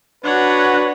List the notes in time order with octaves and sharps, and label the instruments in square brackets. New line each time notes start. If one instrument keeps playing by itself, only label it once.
[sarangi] D4 [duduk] F#4 [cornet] B4 [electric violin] C#5 F#5